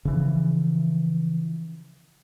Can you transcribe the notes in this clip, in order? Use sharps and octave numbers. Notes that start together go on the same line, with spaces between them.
C#3 E3 F3